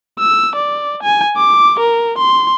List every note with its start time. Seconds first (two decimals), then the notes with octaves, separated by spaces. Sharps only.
0.20 E6
0.55 D5
1.03 G#5
1.37 D6
1.79 A#4
2.18 C6